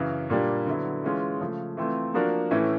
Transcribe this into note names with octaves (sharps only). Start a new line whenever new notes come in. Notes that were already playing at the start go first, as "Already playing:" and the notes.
Already playing: F#2 C#3 E3
A#2 G3 A#3 D4 G4
D3 F#3 B3 E4
E3 G#3 C#4 F4 G#4
C#3 F3 A3
E3 A3 C4 F4
F3 A#3 D4 F#4 A#4
A2 E3 A3 C#4 E4